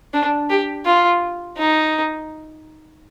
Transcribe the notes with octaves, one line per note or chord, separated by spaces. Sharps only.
D4
G4
F4
D#4